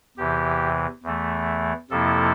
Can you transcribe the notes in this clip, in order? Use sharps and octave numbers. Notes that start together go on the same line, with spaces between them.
E2 C3 E3 G4
E2 E3 A3
F2 C3 F3 A#3 E4 A4